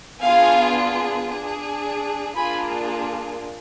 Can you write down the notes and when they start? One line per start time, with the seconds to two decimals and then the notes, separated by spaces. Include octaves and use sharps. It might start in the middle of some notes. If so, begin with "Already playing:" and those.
0.21 B3 D4 F4 G#4 F5 G#5
1.29 D4 G#4
2.36 A#3 D4 F4 G#4 G#5 B5